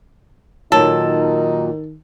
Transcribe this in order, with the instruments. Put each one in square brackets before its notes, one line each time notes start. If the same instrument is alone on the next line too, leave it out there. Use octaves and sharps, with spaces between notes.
[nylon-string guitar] A#2 F#3 [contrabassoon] D#3 [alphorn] D#4 [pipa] A4